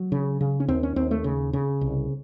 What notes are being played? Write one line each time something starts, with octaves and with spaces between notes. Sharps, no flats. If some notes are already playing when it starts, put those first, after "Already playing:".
Already playing: F#3
C#3
C#3
C#4
D#2 C4
C#4
D#2 C4
A3
C#3
C#3
C2